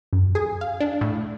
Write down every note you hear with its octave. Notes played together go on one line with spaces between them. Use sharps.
F#2
G#4
F5
D4
A2